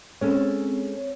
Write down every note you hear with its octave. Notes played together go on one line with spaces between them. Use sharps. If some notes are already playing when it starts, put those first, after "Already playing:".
G#3 C4 C#4 A4 C#5